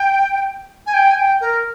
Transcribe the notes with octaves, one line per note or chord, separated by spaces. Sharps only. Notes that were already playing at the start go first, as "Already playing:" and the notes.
Already playing: G5
G#5
G5
G#5
G5
A#4